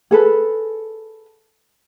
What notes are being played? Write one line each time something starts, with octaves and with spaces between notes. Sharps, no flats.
G#4 A4 B4